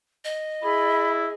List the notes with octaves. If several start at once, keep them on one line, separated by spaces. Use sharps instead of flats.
D#5
E4 G#4 B5